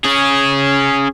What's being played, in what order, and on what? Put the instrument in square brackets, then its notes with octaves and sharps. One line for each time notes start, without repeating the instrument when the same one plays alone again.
[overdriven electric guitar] C#4 G#4